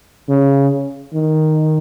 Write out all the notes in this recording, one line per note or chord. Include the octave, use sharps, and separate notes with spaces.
C#3
D#3